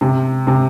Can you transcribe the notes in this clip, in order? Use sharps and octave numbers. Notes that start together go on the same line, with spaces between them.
C3
C3